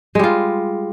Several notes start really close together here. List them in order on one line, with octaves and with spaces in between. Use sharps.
G#3 G3 F4